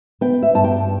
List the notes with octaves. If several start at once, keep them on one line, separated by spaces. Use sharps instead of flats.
B3 G5
E5
G2 A5
G5